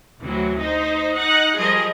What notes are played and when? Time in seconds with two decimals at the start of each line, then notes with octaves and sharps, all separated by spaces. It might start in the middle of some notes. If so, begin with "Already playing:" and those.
0.19 D2 C3 E3 F#3
0.59 D#4 C5
1.18 D#4 F#5
1.57 F3 G3 G#4 A#4 D#5